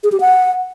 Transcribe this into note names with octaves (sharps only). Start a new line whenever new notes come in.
G#4
G4
F#5